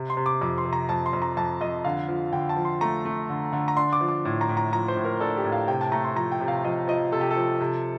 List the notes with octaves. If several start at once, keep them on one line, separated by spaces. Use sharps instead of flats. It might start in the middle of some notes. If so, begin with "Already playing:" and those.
Already playing: C3
C6
C3
D6
F2 D6
C6
C3
A#5
F2 A5
C6
F2
A#5
F2 A5
F2 D#5
D3 F5
F3
D3 G5
A5
F3
C6
A3 A#5
A3
D3
D3
A#5
D4 C6
D6
F3
D6
A2
A#5
A2
A#5
F3 A#5
C5
A2
A#4
D4 A4
G4
A2
F5
C3 G5
A5
A3 A#5
C6
F3 A#5
G5
C3
F5
F3 D#5
F3 D#5
C3 A4
G4
A4
F3
C3